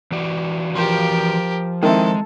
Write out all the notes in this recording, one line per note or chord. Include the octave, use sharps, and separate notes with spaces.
E3 F#4 D5
F3 G4 A#4 C6
D#3 G#3 C4 E4 A4